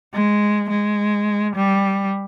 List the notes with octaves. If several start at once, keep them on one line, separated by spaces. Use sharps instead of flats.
G#3
G#3
G3